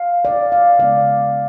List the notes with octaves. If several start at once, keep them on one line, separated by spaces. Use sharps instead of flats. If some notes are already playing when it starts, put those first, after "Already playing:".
Already playing: F5
D5
F5
C#3 G#3 B3 D5